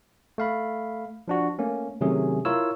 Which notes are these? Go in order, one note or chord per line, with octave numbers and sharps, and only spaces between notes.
A3 F5 B5
F3 D4 F#4
A3 A#3 C#4
C3 D#3 F#3 A3 C#4 G#4
E4 F4 A#4 C#5 E6